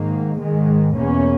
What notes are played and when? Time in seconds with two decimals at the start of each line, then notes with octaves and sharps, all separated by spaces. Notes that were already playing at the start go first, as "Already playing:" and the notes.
Already playing: G#2 D#3 A#3
0.40 G#2 D#3 G#3
0.94 E2 B2 A#3 C#4